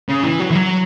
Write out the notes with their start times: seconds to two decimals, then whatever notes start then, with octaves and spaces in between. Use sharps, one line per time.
0.09 C#3
0.23 E3
0.40 F#3
0.51 E3
0.55 F#3